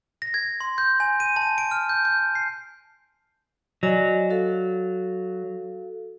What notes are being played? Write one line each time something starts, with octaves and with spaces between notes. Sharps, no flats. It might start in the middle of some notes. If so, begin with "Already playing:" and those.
A#6
G#6
C6
G6
G#5
D#7
A5
D7
F6
G6
G6
C7
F#3 D5 D#5 G#5
F#4 A4 F5